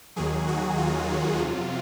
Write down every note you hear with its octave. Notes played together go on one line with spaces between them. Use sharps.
D#2 D#3 F#3 G#4
F#4
F4
F2 C3 F#3